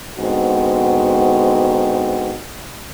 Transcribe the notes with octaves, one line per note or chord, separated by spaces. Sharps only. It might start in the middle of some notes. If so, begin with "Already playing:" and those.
G#2 D3 B3 C4 F#4